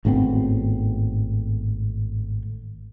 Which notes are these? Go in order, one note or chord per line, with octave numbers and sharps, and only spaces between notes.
G#1 A2 B3 C4